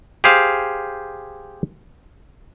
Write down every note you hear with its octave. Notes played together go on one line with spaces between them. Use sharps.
G4 G#4 C5 F5